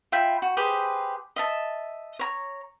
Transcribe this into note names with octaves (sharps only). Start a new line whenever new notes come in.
F4 E5 G5 B5
F#4
G4 G#4 B4 C5
D#5 E5 A5
C#5 A#5